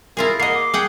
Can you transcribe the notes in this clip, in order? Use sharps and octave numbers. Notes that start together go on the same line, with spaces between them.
E4 F4 G#4 A#4
A#3 D#5 F#5 C7
D6
G#4 F#5 G5